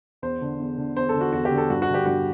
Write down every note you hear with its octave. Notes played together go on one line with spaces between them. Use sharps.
E2 C5
D3
E2
D3
E2 C5
A4
D3
F#4
E2 F#4
G4
D3
A4
G2 F#4
F#4
D3
G4
G2 F#4